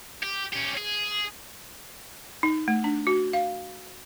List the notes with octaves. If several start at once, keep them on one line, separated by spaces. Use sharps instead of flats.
G4
C#4 G4
G#4
D#4
A3
D4
F#4
F5